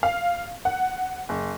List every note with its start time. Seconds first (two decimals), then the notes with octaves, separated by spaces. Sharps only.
0.03 F5
0.65 F#5
1.29 F#1